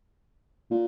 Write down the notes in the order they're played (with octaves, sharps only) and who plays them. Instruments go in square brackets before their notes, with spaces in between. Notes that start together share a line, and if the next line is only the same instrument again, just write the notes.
[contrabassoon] A#2